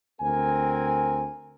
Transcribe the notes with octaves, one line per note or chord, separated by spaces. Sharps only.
D2 C4 A#4 G#5